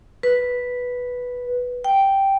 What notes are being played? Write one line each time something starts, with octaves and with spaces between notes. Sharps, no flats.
B4
G5